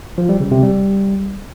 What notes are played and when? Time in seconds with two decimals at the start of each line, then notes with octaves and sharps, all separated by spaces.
0.18 F3
0.29 G3
0.40 C#3
0.51 C3
0.63 G3